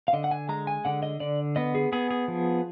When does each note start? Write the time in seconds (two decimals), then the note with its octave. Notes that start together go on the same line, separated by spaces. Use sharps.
0.08 F5
0.13 D3 D#5
0.24 F#5
0.31 G#5
0.49 G#3 A#5
0.67 G#5
0.85 D3 F#5
1.03 D#5
1.20 D3 D5
1.56 B3 D#5
1.75 G#4
1.92 B3 G#4
2.10 G#4
2.28 F3